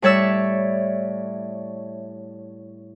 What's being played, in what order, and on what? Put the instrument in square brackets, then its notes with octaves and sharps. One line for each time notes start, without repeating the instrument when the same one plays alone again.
[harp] A2 G3 C#5 D5 E5 E6